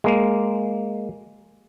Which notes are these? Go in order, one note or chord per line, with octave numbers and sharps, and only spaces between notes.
G#3 A#3